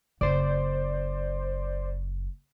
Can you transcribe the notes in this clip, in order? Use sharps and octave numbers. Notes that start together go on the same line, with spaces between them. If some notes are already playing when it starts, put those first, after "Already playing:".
F#1 C5 D5